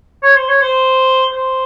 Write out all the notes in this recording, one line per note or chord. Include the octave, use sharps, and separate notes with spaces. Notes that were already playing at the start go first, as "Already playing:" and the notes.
C#5
C5
C#5
C5
C5